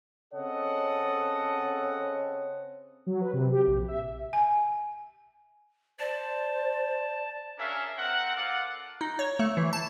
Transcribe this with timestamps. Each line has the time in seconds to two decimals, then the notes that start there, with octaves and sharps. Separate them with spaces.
0.34 C#3 C4 A4 C#5 D#5 F#5
3.07 F#3
3.21 B4
3.33 C3
3.52 G4
3.67 A#1
3.88 E5
4.33 G#5
6.00 C5 D5 A5
7.58 C#4 D4 G#4 A#4 E5 F5
7.98 C4 A#4 F#5
8.35 F4 A4 D5 F5 F#5
9.01 D#4
9.19 C#5
9.39 A3
9.57 E3
9.73 A5